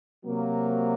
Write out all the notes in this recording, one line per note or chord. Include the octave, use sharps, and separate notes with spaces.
C3 F#3 A#3